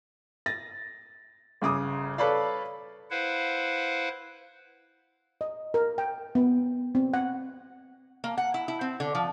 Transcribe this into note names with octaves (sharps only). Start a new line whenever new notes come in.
A6 A#6
G1 C#3 D6 D#6
A4 B4 C#5 D5 F5
E4 B4 C5 F5 F#5
D#5
A#4
G5
B3
C4
F#5
A#3
F#5
E4
E4
C4
D3
F3